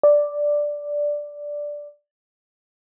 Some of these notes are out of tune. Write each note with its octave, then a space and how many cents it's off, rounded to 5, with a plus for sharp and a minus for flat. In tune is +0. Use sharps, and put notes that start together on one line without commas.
D5 +0